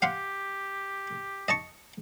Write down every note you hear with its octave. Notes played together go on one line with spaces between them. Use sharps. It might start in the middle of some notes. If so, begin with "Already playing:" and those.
G4 F5 F#5 C6
D#5 A5 C#6